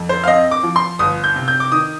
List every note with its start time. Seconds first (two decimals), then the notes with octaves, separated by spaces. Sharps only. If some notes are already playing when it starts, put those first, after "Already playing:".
Already playing: F2
0.09 C5
0.24 F5
0.27 C4 D#5
0.51 D6
0.63 F3
0.76 C6
0.99 G1 D#6
1.24 G6
1.36 C3
1.48 G6
1.60 D6
1.72 D#3 D#6